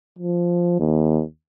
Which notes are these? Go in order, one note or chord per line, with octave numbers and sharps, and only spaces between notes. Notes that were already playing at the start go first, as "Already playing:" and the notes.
F3
D#2